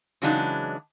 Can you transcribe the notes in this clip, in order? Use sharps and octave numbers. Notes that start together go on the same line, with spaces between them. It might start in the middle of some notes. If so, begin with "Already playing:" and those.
C#3 E3 F#3 G#3 D4 D#4